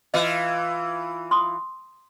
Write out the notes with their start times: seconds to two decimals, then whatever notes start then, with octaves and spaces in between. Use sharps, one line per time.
0.14 E3 F4 D#5
1.31 C6 D#6